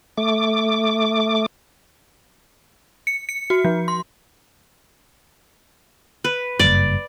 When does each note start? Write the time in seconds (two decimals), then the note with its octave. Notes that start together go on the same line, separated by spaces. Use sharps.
0.18 A3 D6
3.07 C#7
3.29 C#7
3.50 F#4
3.65 F3
3.88 C6
6.24 B4
6.59 F#1 G2 D5